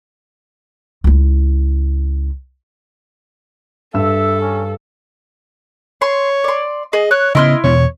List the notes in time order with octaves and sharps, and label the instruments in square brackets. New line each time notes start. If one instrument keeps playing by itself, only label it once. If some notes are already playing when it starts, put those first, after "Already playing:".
[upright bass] C#2 E4
[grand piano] G2 E6 [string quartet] A4 [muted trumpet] E5
[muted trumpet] C#4
[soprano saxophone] C#5 [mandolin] C6
[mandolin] D5 C6
[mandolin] G#4 [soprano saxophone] D#5
[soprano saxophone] C#5 [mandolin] F#6
[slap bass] C#3 B3 [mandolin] E4 C6 F6 [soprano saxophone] D#5
[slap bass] E2 B2 [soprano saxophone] C#5